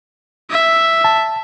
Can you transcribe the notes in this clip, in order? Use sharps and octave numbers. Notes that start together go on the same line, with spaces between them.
E5
A5